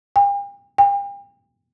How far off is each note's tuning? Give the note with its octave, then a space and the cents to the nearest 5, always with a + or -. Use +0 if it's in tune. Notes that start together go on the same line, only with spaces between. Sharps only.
G5 +45
G5 +40